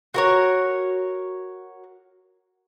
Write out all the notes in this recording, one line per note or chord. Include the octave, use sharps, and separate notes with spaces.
F#4 A#4 C#5